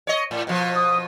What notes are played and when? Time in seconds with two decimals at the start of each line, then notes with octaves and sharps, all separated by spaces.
0.07 C#5 D#5
0.31 A2
0.47 B2 F3
0.76 D#6